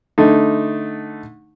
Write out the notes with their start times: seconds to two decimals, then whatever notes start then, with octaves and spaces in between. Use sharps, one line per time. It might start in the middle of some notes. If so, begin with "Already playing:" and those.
0.18 D3 A3 D#4